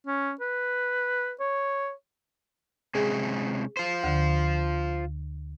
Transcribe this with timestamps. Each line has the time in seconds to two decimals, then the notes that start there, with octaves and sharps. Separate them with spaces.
0.07 C#4
0.41 B4
1.40 C#5
2.95 C3 G#3 C#4 G#4
3.77 F4 C5
4.04 D2 D3